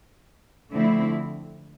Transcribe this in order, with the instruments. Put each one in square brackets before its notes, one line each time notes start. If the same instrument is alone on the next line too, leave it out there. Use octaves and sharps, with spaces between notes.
[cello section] D3 F3 A3 C4 E4